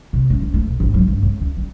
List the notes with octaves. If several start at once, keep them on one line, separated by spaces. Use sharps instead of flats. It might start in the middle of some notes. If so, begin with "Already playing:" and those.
C3
C#4
D2
A3
B1
G#1
F#3
G2
C#3
C#2
G3